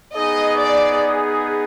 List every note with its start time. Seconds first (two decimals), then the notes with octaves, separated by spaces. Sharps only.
0.15 B3 D#4 G#4 D#5
0.58 D5